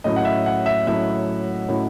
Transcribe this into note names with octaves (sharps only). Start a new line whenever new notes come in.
A2 F#3 C#4 E4 D#5
F#5
E5
F#5
E5
A2 F#3 C#4 E4 E5
A2 F#3 C#4 E4